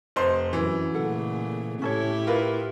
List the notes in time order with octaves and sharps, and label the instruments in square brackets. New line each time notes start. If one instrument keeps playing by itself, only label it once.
[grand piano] F1 C5 C6
[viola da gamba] F#2 [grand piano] E3
[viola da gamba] A#2 C#3 A3 [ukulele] A4 F#5
[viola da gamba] A2 E4 G4 [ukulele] C#4 A4 C#5
[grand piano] F4 [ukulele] A#4 B4